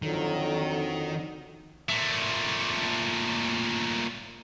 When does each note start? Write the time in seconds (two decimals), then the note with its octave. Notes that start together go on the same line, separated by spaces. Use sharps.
0.02 F2 D3 D#3 F#3
1.89 A#2 A3